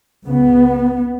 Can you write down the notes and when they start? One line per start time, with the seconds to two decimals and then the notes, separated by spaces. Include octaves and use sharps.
0.26 C#2 C#3 B3